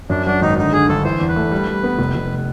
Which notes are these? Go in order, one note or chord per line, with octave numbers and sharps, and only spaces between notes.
F#2 D4
F#3 D4
G#1 D#4
D3 D#4
D3 G#4
G1 A4
E3 C5
E2
B4
A3
G3
G3
B3
F1
F1